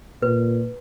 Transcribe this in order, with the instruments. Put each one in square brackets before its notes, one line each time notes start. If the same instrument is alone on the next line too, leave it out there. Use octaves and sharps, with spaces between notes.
[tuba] A#2 [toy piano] B4